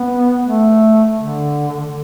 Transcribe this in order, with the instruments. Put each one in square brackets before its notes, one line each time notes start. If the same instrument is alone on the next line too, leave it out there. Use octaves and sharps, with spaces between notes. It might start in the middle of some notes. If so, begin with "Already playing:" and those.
Already playing: [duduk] B3
A3
D3